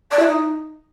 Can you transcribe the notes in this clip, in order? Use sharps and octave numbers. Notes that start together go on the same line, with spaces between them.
D5
E4
D#4